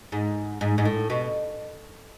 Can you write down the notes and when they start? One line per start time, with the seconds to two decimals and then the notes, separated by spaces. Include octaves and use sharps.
0.12 G#2
0.61 G#2
0.78 G#2
0.85 A2
1.10 B2